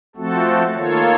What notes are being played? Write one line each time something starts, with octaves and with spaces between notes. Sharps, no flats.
F3 A3 C4 F#4 A4
D#3 A#3 F4 A4 C#5